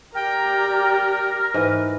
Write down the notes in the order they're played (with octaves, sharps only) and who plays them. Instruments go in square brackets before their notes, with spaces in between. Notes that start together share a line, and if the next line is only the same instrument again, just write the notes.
[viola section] G4 D5 A#5 [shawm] A#4 [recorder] G5
[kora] G#2 E3 [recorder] B4